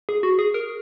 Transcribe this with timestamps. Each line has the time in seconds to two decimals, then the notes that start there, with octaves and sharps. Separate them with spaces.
0.09 G#4
0.23 F#4
0.39 G#4
0.54 A#4